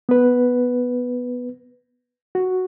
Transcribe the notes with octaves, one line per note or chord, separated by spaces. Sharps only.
B3 B4
F#4